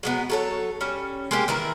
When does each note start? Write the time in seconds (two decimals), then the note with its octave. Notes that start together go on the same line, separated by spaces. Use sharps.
0.03 F#3 G#3 B3
0.30 F#3 A4 C#5
0.81 G3 C#4
1.31 G#3 A#3 G4
1.48 D#3 E3 E4 A#4